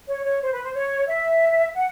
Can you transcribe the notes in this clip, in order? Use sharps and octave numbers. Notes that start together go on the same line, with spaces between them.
C#5
C#5
C5
B4
C5
C#5
E5
F#5